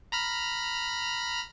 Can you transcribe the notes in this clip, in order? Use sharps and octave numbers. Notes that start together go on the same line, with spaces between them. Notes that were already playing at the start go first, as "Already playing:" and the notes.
A#5 B5 F6